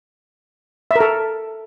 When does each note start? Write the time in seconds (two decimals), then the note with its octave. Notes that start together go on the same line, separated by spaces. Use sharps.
0.91 E5
0.96 A#4
1.00 A4